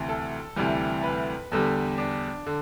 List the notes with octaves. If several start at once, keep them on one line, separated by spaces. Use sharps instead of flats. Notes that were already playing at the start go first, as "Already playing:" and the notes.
Already playing: D2 C3 E3
A4
D2 C3 E3 G3
B4
E2 D3 G3
D4
D3